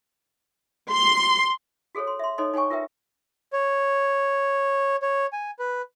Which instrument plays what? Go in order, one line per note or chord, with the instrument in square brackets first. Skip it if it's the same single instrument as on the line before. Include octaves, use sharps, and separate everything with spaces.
[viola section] C6
[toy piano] F#4 G#4 A4 C5 C#5
C6
E5 C6
D#4 A4 C5 C#5 D#5 C6
D#4 C#5 G5 G#5 C#6
F4 A#4 B4 E5 G5
[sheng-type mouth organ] C#5
C#5
G#5
B4